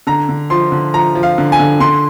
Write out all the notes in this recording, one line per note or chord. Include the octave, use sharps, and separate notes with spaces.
D3 A#5
D3
F3 C6
D3
F3 A#5
F3
F5
D3
G#5
D3
D3 C6